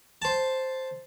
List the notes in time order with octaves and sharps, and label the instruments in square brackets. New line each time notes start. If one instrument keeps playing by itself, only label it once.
[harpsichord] C5 A5